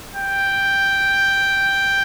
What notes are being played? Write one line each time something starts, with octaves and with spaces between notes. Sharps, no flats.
G5